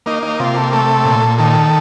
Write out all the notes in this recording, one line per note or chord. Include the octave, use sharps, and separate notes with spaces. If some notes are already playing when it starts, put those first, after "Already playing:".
A#3 D#4
D#4
C3 F4
A4
A3 A4
A#2
D#3 A4